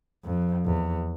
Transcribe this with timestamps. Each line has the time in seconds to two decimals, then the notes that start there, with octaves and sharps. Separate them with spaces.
0.25 F2
0.66 E2